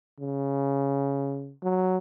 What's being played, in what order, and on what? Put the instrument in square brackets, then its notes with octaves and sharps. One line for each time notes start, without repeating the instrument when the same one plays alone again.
[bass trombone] C#3
F#3